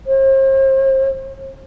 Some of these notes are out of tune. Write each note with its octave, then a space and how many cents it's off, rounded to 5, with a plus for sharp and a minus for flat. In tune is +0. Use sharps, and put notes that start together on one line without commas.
C5 +40